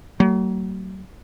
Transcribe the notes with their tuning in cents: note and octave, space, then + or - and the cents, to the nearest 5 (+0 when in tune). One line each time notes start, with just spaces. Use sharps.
F#3 +35 A#3 -45